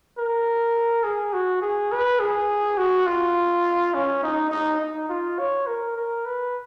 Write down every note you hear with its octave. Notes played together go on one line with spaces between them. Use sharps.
A#4
G#4
F#4
G#4
B4
G#4
F#4
F4
C#4
D#4
D#4
D#4
F4
C#5
A#4
A#4
B4